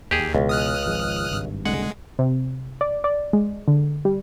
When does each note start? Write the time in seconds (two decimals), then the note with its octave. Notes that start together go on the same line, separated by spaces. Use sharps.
0.11 D#2 G4 G#4
0.35 C#2 B2 E3 G#3
0.49 D#6 F6 F#6
0.86 G#1 F3 G#3
1.31 G#1 G2
1.65 F#1 C2 D3 G#3 F#5
2.19 C3
2.81 D5
3.04 D5
3.33 G#3
3.68 D3
4.05 G3